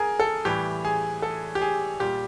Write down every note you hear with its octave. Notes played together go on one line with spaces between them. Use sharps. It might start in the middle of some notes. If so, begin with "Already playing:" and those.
Already playing: G#4 A#4
A4
A2 E3 G3 G4
G#4
A4
G4
G#4
A#2 G3 G4